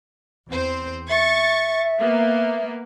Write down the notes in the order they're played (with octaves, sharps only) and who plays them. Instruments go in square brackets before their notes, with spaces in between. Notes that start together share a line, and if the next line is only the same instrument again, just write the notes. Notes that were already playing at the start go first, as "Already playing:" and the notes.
[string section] E2 C4 C5
[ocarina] E5 [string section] C#6 A6
[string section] A#3 B3